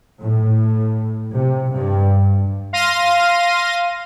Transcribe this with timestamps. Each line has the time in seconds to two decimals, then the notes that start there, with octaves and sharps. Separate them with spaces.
0.23 A2
1.35 C3
1.72 G2
2.73 F5 C6 A#6 D#7